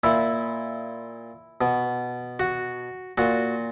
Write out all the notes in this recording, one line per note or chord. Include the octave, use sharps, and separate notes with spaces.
A#2 E4
B2
F#4
A#2 F#4